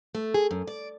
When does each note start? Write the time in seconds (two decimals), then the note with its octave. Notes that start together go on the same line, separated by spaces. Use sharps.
0.15 A3
0.34 G#4
0.51 F#2
0.67 D5